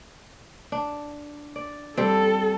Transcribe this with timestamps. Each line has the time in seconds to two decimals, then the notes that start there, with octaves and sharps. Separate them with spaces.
0.72 D4
1.56 D5
1.97 G3 C4 A4